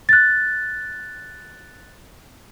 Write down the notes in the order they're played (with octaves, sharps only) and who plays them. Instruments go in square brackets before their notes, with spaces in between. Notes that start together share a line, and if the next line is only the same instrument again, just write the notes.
[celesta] F#6 A6